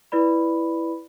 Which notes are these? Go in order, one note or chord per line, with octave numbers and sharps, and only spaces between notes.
E4 B4 D5 B5